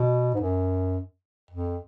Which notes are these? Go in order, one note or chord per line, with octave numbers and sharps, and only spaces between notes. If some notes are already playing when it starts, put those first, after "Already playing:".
Already playing: B2
G#2
F#2
F2